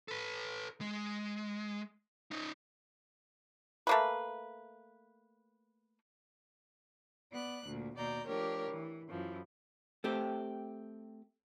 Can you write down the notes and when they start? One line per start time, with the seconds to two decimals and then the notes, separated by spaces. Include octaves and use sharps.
0.08 A4 B4
0.81 G#3
2.31 C#4 D#4
3.87 A3 A#3 B4
7.32 B3 D5 F#6
7.66 D2 A#2
7.97 D#2 B2 D5 A#5 G6
8.26 F3 A3 D4 G4 A#4 C#5
8.70 E3
9.10 F#2 E3 F3
10.04 A3 C4 G4